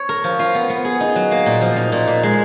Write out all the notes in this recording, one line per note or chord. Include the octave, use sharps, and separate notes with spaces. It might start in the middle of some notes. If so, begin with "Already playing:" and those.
Already playing: C#5
A#4
F3
F4
B3
B3
G#4
D#4
F#3
A#3
A#2
F3
D#4
A#2
A#2
G#3